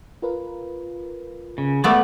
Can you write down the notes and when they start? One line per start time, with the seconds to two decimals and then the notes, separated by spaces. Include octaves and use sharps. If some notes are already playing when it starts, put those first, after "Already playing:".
0.22 F4 A#4 B4
1.58 C#3
1.84 A3 B3 C#5 D5 B5 D6